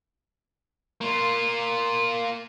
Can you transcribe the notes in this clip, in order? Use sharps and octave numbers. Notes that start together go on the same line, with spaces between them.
A#3 F4